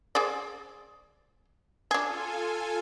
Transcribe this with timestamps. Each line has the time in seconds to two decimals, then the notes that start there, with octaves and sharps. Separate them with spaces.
0.15 G#4 C5 D5
1.91 D4 F4 G#4 A4 G#5